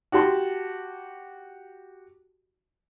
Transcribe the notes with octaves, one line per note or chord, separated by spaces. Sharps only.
F#4 G4 A5 C6